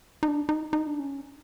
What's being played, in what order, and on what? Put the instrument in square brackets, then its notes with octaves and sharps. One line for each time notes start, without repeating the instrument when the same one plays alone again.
[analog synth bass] D#4
D4
D#4
D#4
D4
C#4